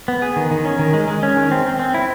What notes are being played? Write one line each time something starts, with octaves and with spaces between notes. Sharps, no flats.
B3
G#4
D#3
D#3
C#4
D#3
G#3
G#3
C#4
D#3
C4
C4
C4
E4